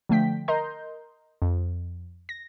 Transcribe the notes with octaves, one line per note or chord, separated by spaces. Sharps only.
D3 F3 A3 G5 B6
A#4 D#5 A#5 C6 G6
F2
A#6